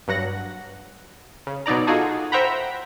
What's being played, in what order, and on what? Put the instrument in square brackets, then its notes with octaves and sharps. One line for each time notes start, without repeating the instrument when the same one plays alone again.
[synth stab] G2 F#3 F#5 A#6
C#3
B2 F#3 D#4 D5 A#5
D#4 F4 F#4 G#4 A4
C5 E5 F#5 G5 A#5 B5